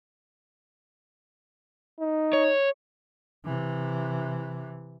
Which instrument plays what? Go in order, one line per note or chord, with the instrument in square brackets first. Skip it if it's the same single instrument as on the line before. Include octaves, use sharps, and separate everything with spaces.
[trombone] D#4
[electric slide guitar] C#5
[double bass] C3 E3